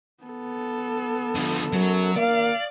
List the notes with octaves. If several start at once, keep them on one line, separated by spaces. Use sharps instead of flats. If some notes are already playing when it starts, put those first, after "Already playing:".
B3 A4
D3 F3
F#2 F#3
A#3 D5 F5